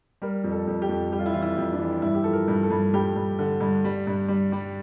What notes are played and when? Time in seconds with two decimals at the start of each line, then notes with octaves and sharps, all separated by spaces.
0.22 G3 A#4
0.44 F2
0.52 A4
0.67 F2
0.82 G4
0.89 F2
1.12 G3 G4
1.19 F4
1.26 E4
1.33 E3 F4
1.42 E4
1.57 F2
1.73 D4
1.79 E3
2.02 G2 E4
2.14 G4
2.24 F3 A4
2.33 A#4
2.48 G2
2.63 A4
2.70 G2
2.94 G2 G4
3.16 G2
3.39 D3
3.60 G2
3.84 G3
4.07 G2
4.28 G3
4.52 G3